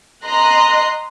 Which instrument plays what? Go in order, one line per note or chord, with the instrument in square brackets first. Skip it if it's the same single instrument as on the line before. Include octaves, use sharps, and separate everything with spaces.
[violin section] D#5 A#5 C6 F#6